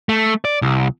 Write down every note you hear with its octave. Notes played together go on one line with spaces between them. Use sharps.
A3
D5
C2